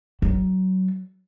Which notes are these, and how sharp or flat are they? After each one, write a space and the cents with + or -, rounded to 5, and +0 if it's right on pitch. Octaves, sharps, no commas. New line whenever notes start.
F#3 +20